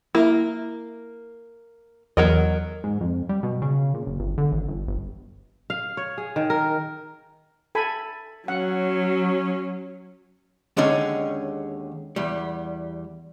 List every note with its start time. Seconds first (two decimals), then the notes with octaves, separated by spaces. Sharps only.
0.15 A#3 E4
2.17 E2 F#3 A#4 D#5
2.84 G#2
3.01 F2
3.29 G3
3.43 B2
3.62 C#3
3.94 A#2
4.07 F#1
4.19 G1
4.38 D3
4.52 A1
4.68 G1
4.87 G1
5.70 F5
5.97 C#5
6.18 G#4
6.36 D#3
6.50 A#4
7.75 A4 G#5 B5
8.48 F#3 C#4 F#5
10.77 D#2 D3 G#3 C#4 D#4
12.16 E2 G3